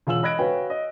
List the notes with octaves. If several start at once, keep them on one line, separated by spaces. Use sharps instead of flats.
E1 F4 G#5 E6 F#7
D#5 B5 F#6 G#6 A#6 D7
F#4 B4 C#5 F5 G5 G#5
D#5